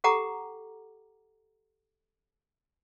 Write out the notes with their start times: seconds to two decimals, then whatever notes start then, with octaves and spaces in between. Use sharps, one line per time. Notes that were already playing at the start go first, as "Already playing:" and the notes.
0.04 G4 A4 F#5 G5 A#5 D6